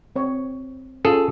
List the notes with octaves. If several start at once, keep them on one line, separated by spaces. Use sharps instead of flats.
C4 C#5
C#4 F4 G#4 A4